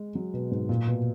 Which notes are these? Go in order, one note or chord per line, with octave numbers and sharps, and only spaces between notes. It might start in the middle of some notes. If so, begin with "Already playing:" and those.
Already playing: G#3
F#3
B2
G#2
A#2
B2